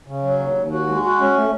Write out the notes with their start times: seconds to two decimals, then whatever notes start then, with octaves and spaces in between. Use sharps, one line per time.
0.07 C#3
0.22 F#3
0.39 D#2
0.54 D#2
0.71 F#4
0.87 G#3
1.03 F#4
1.18 C#4
1.35 A3